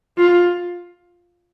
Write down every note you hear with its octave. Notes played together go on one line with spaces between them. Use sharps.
F4